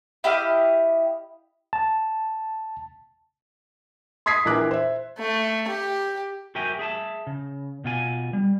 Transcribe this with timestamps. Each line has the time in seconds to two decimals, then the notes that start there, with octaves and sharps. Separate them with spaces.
0.24 E4 G4 D#5 F5
1.73 A5
4.26 C6 D#6 G#6 B6 C7
4.45 A#1 E3 A#4 D6 F#6
4.71 C5 E5
5.18 A3
5.68 G4
6.55 F#4 G4 A#4 E5 G5 G#5
6.79 G#4 E5 G#5 A5
7.27 C#3
7.84 B2 F4 G#5
8.33 G3